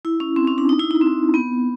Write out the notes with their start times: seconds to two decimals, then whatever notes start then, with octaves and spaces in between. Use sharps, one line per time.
0.05 E4
0.20 C#4
0.36 C4
0.47 C#4
0.58 D4
0.69 D#4
0.80 E4
0.91 D#4
1.01 C4
1.34 B3